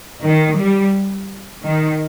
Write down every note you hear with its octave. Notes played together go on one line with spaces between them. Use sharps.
D#3
G3
D#3